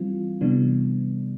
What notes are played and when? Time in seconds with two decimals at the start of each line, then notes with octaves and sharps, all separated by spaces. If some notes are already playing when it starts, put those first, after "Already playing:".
Already playing: E3 G3 C4 F4
0.41 C3 E3 G3 B3 D4